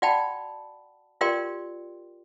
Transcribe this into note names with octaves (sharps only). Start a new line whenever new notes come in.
F#4 D5 F#5 G5 A5 B5
F4 G4 A#4 D5 G5 C6